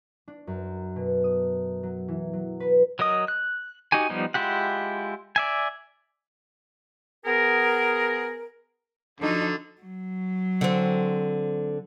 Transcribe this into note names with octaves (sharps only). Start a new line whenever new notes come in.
D4
F#2
B2
D#6
F#3
E3
F#3
B4
F#3 A#4 D#5 D#6
F#6
D#4 F#4 G4 G#5
F3 G3 B3 D#4
G#3 E4 F4 G4 F#5
D5 E5 G#5
B3 G#4 A#4
D3 F3 D#4 F#4
F#3
D3 C4